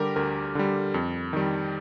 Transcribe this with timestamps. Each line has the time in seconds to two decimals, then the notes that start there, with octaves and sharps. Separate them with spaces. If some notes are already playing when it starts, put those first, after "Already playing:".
Already playing: D3 G3 G4 A#4
0.16 D2 A#4
0.55 D3 G3
0.94 F2
1.33 D#3 G3